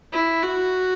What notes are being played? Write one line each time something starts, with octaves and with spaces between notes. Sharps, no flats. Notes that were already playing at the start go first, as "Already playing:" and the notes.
E4
F#4